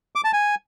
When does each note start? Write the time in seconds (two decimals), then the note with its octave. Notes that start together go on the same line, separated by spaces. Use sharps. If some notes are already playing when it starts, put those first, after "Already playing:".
0.15 D6
0.24 A5
0.33 G#5